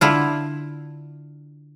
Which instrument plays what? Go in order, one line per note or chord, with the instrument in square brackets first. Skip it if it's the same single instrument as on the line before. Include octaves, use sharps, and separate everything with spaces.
[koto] D3 E4 F4